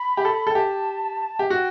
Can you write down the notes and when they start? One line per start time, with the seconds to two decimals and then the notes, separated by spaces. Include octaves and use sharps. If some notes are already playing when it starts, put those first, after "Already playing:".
Already playing: B5
0.17 G4
0.25 A4
0.47 A4 G5
0.55 G4 A5
1.39 G4
1.50 F#4 G5